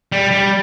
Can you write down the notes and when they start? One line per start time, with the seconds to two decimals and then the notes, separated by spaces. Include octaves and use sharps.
0.12 G3
0.31 G3